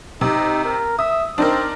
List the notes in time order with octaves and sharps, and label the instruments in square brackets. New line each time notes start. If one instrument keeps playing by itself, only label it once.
[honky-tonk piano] C3 [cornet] D#4
[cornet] A#4
[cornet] E5 [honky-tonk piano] D#6
[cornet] C4 [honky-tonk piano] D4 D#4 A#4